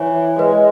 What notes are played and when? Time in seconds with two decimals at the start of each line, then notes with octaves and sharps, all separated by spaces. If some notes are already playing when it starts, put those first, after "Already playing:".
Already playing: E3 C#5
0.39 G#3 B4